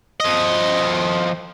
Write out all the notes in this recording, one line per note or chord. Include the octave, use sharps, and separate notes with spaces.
F3 D#5